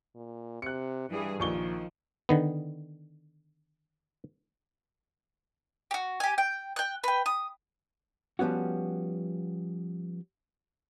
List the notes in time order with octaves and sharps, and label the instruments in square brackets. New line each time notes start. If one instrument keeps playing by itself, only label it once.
[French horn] A#2
[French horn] C3 [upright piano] F#6 C#7
[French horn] G2 [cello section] E3 G3 G#4
[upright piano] A#1 C#6 G7 [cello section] D#3 F3
[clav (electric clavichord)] D3 D#3 B3
[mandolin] F#4 G4
G4 G#5
G5
G5 F#6
B4 G5
D#6
[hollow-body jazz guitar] F3 G3 B3 C#4 F#4